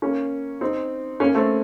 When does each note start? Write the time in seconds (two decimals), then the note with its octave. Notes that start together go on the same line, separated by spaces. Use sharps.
0.02 A#3 C#4
0.61 C4 D#4
1.20 A#3 C#4
1.35 A3 C4